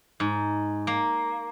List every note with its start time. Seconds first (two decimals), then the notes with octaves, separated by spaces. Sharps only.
0.20 G#2
0.87 A#3